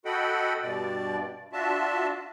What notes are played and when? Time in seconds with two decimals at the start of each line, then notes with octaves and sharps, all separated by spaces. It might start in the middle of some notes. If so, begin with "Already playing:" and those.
0.05 F#4 A4 D#5 F#5 G5 B5
0.62 G2 B2 D5
1.53 D4 F4 F#4 E5 A5